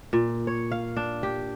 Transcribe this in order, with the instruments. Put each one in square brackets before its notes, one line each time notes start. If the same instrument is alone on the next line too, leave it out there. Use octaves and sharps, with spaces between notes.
[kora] A#2
C#5
F5
D4
G4